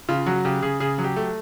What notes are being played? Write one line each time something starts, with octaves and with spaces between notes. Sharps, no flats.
C#3 F4
F#3 F#4
C#3 G4
C#3 G#4
C#3 G#4
F#3
G4
A3